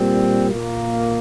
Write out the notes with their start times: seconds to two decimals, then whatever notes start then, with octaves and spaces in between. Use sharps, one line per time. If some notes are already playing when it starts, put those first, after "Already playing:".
Already playing: A#2 G3 C4
0.49 A#2 A#3